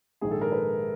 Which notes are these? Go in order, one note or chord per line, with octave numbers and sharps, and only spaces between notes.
A#1 G#2 D#3 G#4
A4
A#4
B4